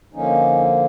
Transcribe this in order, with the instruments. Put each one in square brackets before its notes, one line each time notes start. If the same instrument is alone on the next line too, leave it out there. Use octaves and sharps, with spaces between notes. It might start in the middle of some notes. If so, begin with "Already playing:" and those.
[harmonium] D3 F3 A#3 C#4 D#4